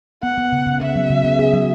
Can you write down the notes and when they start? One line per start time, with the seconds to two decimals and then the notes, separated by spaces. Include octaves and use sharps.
0.23 B3 F#5
0.38 B3
0.52 C#3
0.67 C#3
0.81 B3 E5
0.96 F#3
1.10 C#3
1.24 B3
1.39 G#4
1.53 F#3